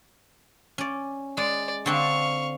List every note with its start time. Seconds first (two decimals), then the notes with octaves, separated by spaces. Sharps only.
0.78 C#4 D5
1.37 G#3 D5
1.86 D3 C4 D4 F5 C#6